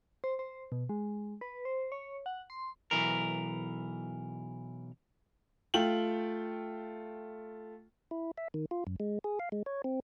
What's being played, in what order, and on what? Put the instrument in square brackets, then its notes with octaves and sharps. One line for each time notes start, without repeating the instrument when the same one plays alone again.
[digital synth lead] C5
C5
B2
G#3
B4
C5
C#5
F#5
C6
[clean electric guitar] B1 E3 A#4
[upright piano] A3 F4 G5 F#7
[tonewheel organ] E4
E5
D#3
F4
F#2
G#3
G#4
F5
G#3
C#5
C4